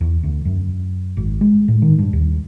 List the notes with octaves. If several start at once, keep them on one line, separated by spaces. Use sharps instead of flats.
E2
D2
F#2
G#1
G#3
A2
D#3
G2
D#2